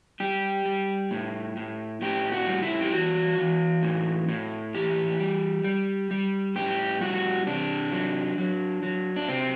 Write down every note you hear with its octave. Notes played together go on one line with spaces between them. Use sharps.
G3 G4
G3
A2
A2
A2 G4
F#4
G3
E4
G4
E3 F#4
E3
A2
A2
E3 G4
G3
G3
G3
A2 G4
G3 F#4
C3 D4
F#3
F#3
F#3
D4
C3 C4